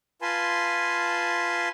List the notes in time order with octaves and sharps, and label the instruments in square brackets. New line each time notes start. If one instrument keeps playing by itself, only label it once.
[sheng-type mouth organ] F4 B4 G#5 A5 C6